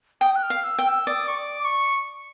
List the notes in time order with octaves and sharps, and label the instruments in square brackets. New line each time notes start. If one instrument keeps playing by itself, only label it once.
[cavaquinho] G5 [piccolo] D#6
[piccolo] F#6
F6
[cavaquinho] F5
[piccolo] E6
[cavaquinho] G5
[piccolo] E6
[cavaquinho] D5 [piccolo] D#6
[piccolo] C#6
D6
C#6